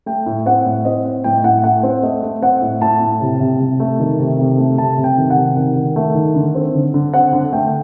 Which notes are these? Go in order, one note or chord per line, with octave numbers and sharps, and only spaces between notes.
A3 G5
A2
C4 F#5
A2
C4 D#5
C4
A2 G5
A2 F#5
A3 F#5
C4
A3 D#5
A3
C4 F#5
A2
A2 A5
A2
C3
C3
C3
A3
D#3
C3
C3
A3
C3 A5
C3
G5
D#3
F#5
C3
D#3
D#3
A3
D#3
D3
C4
D3
D3
C4 F#5
D3
A3 G5